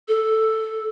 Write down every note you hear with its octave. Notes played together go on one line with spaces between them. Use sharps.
A4